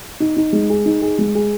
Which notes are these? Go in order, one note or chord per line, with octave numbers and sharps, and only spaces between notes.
D#4
D#4
G#3
G#4
D#4
G#4
G#3
G#4